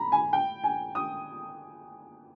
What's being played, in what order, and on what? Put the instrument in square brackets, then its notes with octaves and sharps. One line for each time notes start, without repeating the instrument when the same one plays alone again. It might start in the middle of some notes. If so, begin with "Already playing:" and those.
Already playing: [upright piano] A#5 B5
G#5
G5
G#5
D#6